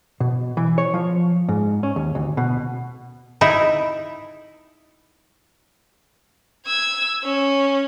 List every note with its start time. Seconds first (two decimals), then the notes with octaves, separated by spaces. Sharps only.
0.20 B2
0.57 E3
0.78 C#5
0.94 F3
1.49 G#2
1.83 C#4
1.96 D#2
2.15 D2
2.37 B2
3.41 D#4 E4
6.66 E6 G#6
7.24 C#4